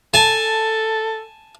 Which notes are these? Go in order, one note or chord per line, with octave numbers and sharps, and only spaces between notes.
A4 G#5 A5